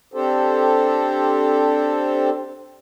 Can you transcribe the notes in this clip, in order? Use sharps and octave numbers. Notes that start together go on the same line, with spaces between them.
C4 D4 G4 A4 C5